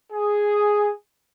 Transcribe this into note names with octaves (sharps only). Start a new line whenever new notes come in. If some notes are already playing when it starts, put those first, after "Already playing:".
G#4